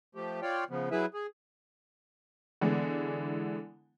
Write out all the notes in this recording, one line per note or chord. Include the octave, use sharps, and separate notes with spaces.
F3 A3 G4
F4 C#5 D5 F5 G5
C#3 F3 B3
F#3 E4 G#4 B4 E5
G#4
D3 E3 G#3 B3